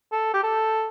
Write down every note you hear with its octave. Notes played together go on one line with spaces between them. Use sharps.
A4
G4
A4